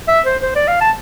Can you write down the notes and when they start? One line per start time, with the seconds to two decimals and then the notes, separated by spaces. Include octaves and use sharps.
0.08 E5
0.26 C5
0.43 C5
0.56 D5
0.68 F5
0.81 A5